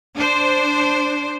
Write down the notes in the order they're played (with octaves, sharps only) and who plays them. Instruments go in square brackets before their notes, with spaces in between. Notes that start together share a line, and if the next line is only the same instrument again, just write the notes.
[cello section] D4 C5